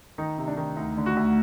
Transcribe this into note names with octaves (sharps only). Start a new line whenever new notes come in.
D#3 D#4
C3
D4
D#3
D2 D#4
D3
F#4
D2